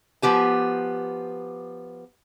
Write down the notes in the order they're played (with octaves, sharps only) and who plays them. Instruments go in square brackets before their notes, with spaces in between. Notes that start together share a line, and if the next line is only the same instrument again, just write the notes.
[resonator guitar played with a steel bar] F3 B3 G4 G#5